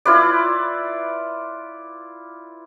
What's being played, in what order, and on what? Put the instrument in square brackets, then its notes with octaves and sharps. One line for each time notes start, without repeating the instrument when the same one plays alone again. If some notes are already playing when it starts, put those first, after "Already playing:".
[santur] E4 F4 B4 D5